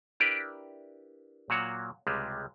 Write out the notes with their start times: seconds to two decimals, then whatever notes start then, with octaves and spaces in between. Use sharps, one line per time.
0.20 D4 E4 G4 A#4 B4 D5
1.50 A#2 F#3 A#3 F#4 C#5 F#5
2.07 C#2 C3 G3 G#3